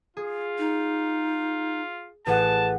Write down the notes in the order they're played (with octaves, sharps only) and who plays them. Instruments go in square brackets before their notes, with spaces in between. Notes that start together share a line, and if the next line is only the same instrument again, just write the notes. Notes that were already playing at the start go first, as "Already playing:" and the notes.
[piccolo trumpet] F4 [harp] G#4
[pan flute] D#4
[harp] A1 G#4 F#5 [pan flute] B4 [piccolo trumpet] A5